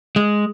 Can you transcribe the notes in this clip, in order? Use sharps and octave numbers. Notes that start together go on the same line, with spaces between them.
G#3